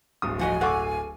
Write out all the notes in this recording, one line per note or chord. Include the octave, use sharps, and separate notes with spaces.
D1 G1 D#6
F3 F#4 D#5 G#5
A4 F5 F#5 C#6 D6